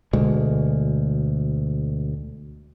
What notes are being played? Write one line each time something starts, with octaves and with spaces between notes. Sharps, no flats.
D2 B2 G#3